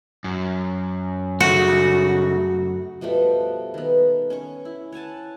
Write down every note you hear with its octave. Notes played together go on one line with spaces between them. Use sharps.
F#2
C#3 A3 F#4
B2 F3 G3 A3
D#3 B3
C#4 C#6
E4
C#5 F#5 G#5 A5